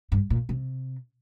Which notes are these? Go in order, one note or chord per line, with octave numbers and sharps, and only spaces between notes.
G2
A#2
C3